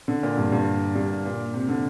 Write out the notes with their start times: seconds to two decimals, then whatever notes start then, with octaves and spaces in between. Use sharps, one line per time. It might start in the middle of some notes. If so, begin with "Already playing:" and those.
0.08 D3
0.23 A#2
0.37 G2
0.52 G2
0.96 G2
1.25 A#2
1.54 C3
1.69 D3